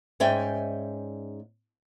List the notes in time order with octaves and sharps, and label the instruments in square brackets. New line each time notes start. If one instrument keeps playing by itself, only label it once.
[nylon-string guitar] G#2 C#4 D5 E5 G5 G#5